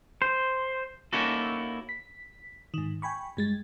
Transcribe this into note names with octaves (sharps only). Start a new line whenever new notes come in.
C5
A#3 C#4 D#4 E4 F#4 A4
B6
G#2 D#3
G5 G#5 B5 C#6
G2 G#3 A6